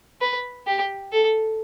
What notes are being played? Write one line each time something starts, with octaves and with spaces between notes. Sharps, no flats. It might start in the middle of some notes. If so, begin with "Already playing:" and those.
B4
G4
A4